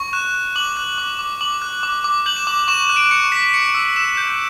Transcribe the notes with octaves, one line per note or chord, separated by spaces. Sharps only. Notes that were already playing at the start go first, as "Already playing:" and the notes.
Already playing: C#6
F#6 E7
F#6
D6 F#7
F#6
D6
D6
D6 F#7
F#6
D6
D6
G6 F#7
E7
D6 F#7
C#6 E7
F#6
D7
C#6 C#7
C#6 B6
C#6 C#7
E6
E6 E7
G6